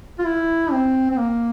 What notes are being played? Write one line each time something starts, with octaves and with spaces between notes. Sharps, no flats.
F4
E4
C4
C4
A#3